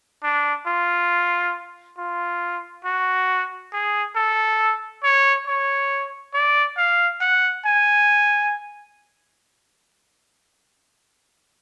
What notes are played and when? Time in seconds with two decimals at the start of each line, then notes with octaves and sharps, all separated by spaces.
0.23 D4
0.66 F4
1.98 F4
2.85 F#4
3.73 G#4
4.16 A4
5.04 C#5
5.47 C#5
6.34 D5
6.77 F5
7.21 F#5
7.66 G#5